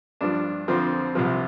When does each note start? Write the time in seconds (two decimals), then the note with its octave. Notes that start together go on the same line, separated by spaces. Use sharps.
0.21 G2 F3 D4
0.68 F2 D3 F3 C4
1.15 C2 C3 F3